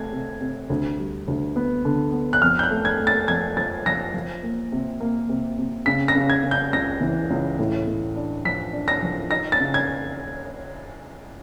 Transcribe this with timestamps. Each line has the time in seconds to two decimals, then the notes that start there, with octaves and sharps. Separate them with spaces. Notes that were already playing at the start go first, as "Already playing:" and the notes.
Already playing: C3 A3 G#6
0.12 C3
0.41 C3
0.70 D2
0.98 G3
1.28 D2
1.56 B3
1.85 D3
2.13 B3
2.33 F#6
2.42 F2 F6
2.59 G6
2.63 F#6
2.70 A3
2.85 G#6
3.00 A3
3.07 A6
3.28 F2 G#6
3.57 F3 A6
3.86 F3 A#6
4.14 F3
4.43 A#3
4.72 C3
5.00 A#3
5.29 C3
5.58 C3
5.86 C#3 B6
6.08 A#6
6.15 C#3
6.30 G#6
6.44 C#3
6.51 G6
6.73 C#2 A#6
7.01 E3
7.30 C#2
7.59 A2
7.87 A2
8.16 D4
8.45 F3 B6
8.73 D4
8.88 A#6
9.02 F3
9.31 D#4 A#6
9.52 A6
9.60 C#3
9.74 G#6